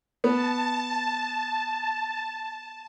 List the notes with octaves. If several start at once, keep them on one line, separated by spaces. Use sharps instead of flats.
B3 A5